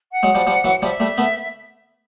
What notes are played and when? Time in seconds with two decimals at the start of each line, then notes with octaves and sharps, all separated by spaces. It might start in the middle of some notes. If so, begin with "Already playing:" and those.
0.12 F#5
0.23 F#3 G#3
0.35 F3 G3
0.47 F3 G3
0.64 E3 F#3
0.82 F3 G3 E5
1.00 G3 A3
1.18 A3 B3